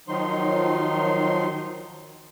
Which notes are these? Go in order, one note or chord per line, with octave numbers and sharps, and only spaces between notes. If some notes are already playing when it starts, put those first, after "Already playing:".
D#3 F3 F#3 D#4 C6